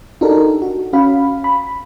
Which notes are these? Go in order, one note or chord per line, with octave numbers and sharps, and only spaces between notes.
D4 D#4 F#4 G4 A4 A#4
F#4
C#4 F#4 F5 B5
B5